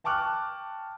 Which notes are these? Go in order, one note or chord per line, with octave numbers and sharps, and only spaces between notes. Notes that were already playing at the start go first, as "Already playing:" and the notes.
G5 A5 C#6 D6 F6 F#6